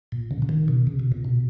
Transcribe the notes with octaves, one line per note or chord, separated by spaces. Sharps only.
A#2
C#3
C#3
D#3
B2
C#3
B2
A#2
B2